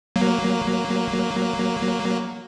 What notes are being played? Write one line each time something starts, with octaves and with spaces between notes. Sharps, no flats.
F#3 A#3